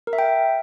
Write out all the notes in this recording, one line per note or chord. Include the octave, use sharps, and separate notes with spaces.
A#4
E5
G5